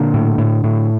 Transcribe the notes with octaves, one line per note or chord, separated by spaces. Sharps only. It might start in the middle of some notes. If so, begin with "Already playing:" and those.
Already playing: A#2 D3
A2
A2
A2